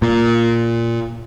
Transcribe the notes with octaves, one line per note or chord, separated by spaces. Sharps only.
A#2